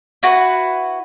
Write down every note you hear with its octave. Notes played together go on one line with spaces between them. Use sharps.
E4 F#4 B4